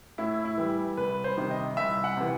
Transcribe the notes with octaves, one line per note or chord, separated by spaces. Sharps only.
A2 E4
E4
E3 G3
C2 B4
C5
C3 D#3 G3
D#5
C2 E5
F#5
C3 E3